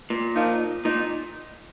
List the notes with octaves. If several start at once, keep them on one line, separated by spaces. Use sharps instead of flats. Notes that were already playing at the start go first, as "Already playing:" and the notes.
A#2
F3 A#3 D#4
A#2 D#4